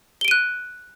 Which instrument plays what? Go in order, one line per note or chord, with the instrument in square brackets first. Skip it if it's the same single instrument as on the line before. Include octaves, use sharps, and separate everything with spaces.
[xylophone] G7
D7
D#7
F#6